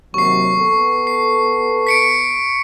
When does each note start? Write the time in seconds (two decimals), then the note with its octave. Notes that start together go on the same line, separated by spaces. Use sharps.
0.14 D#2 C3 F#3 C#6 C7
0.59 B3 A4
1.07 C7
1.87 B6 C#7 D7